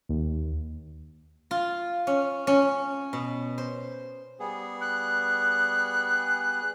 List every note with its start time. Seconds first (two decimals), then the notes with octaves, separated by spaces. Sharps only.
0.09 D#2
1.51 F4
2.07 C#4
2.47 C#4
3.13 B2
3.58 C5
4.40 G3 B3 G#4
4.81 F#6